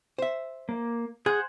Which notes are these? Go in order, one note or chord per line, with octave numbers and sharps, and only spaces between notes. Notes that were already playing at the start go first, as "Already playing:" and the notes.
C5 E5
A#3
G#4 C5 F#5 G#5